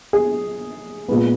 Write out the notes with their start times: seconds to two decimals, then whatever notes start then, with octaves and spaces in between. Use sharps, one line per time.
0.13 G#4
1.08 A#2 G#3 B3